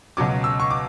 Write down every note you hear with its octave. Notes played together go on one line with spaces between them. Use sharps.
C#2 B2 F#3 C#4 D6
E6
C#6
D6